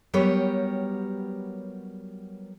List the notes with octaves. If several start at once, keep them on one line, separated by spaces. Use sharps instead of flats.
F#3 G3 B3 G4 A#4 C#5